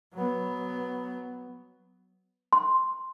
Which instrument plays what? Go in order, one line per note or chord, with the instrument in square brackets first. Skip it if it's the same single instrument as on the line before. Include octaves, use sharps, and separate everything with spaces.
[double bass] F#3 B3
[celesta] C6